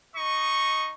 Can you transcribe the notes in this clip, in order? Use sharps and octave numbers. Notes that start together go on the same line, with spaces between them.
D#4 D#5 C#6